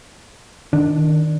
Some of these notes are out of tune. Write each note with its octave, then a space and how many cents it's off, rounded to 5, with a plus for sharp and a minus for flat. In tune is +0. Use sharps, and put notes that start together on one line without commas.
D#3 +0 D4 +0